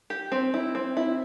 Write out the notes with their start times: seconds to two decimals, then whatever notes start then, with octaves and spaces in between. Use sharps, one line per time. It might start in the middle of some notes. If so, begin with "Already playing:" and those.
0.10 G4
0.32 C4
0.54 E4
0.75 C4
0.97 E4